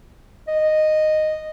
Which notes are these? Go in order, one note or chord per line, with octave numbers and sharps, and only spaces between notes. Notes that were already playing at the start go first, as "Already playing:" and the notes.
D#5